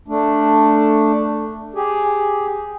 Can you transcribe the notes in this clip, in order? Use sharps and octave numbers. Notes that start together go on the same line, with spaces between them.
A3 D4
G4 G#4